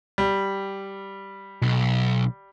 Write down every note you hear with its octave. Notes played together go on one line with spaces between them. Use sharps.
G3
B1